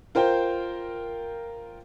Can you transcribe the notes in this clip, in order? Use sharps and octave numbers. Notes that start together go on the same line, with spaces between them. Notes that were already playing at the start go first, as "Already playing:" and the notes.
F4 A#4 C5 G5